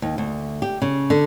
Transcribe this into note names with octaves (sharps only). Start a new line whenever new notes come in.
D#2
D2
G4
C#3
D3